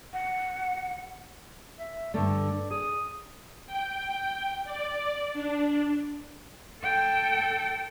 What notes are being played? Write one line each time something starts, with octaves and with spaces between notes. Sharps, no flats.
F#5
E5
G2 D3 A3 D5
G#4 D#6
G5
D5
D4
A4 G5